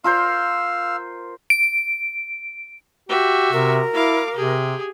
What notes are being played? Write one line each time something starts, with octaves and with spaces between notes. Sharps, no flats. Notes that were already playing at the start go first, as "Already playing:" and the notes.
F4 A#4 C5 F5 E6
D7
F#4 G4 E5
C3 A#4
E4 F5 D6
C3 G4 G#4